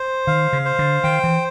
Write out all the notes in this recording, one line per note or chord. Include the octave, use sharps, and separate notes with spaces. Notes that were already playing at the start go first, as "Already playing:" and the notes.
Already playing: C5
D#3 F5
C#3
C5
D3
D#3 G5
E3